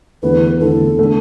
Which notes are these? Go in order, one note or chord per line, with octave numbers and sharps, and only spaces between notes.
E2 D3 A3 E4 B4
E2 D3 A3 E4 A4
D3 A3